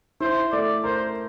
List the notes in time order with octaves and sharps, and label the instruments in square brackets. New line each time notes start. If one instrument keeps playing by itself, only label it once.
[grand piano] E4 [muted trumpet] C5
[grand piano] A3 [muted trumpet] D5
[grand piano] A#4 [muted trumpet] C5